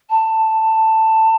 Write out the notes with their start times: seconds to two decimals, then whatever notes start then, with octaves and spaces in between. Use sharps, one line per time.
0.10 A5